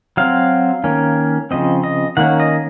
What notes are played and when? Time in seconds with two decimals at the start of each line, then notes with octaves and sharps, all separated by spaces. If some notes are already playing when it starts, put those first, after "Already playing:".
0.17 F#3 C4 F5
0.84 D#3 A#3 C#4
1.51 C#3 F3 C4 D#5
1.84 D#5
2.17 D#3 A#3 C#4 F#5
2.40 D#5